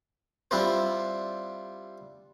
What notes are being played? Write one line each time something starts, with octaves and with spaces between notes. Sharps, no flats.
G3 C4 D4 E4 F4 C5